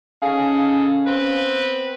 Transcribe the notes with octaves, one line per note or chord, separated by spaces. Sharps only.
C#4 D#4 G#4 A4 F5 G#5
B3 C4 B4